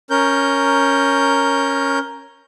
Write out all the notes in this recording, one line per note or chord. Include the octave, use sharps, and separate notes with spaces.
C#4 A#4 G6